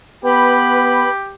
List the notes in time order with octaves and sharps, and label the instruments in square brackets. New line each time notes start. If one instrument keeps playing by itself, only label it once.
[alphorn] B3 [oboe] G4 [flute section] B4 B5